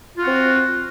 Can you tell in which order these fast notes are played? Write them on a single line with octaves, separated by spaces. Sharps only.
F4 F#4 C4